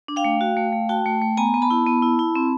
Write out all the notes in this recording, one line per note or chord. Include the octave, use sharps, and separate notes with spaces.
D4
F5 G5
A3
F#4
A3
A3
F#4 G5 A5
A3
A3
B3 G#5 A#5
B3
A5 B5
E4
B3
E4
E4
C4